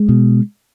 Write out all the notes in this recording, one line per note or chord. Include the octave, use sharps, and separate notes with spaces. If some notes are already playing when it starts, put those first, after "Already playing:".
Already playing: G#3
B2